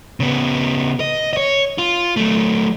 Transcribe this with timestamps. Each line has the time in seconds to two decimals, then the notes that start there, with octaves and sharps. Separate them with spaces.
0.20 C#3 B3
1.00 D#5
1.33 C#5 D#5
1.78 F4
2.17 F#3 A3